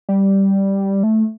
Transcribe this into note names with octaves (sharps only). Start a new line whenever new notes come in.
G3
A3